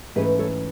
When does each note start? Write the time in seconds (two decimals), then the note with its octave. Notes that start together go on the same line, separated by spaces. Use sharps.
0.15 G#2 E3 A3 C#4 G#4 B4
0.39 A4 C#5